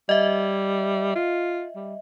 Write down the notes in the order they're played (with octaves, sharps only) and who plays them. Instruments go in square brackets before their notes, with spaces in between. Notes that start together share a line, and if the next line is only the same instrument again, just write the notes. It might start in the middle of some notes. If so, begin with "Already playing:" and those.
[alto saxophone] G3 [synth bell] D#5 E5
[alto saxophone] F4
G3